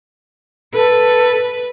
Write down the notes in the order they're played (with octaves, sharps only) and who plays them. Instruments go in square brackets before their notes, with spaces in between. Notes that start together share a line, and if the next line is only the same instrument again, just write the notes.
[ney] A4 [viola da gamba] B4